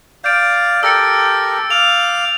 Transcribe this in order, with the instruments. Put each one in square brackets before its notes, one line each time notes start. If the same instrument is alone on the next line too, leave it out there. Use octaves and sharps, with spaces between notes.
[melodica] D5 F5 [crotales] G6 D7
[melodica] G4 A4 A#4 [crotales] E6 A6 C#7
[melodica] F5 D6 [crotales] F7